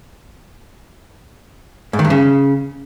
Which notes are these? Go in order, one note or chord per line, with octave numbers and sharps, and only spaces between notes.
G#2
D#3
G2
C#3